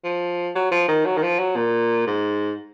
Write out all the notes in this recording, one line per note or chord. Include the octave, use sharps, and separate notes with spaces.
F3
F#3
F3
D#3
F#3
D#3
F3
F#3
A#2
G#2